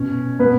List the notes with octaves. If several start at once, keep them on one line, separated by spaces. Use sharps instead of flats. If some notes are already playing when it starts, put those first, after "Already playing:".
Already playing: B2 C#4
B2 B3 B4